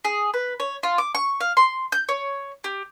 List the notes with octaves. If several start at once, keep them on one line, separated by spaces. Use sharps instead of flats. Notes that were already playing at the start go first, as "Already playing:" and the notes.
G#4
B4
C#5
F4
D6
C#6
F5
C6
G6
C#5
G4